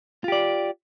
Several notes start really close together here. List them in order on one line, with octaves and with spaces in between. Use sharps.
F4 G4 D5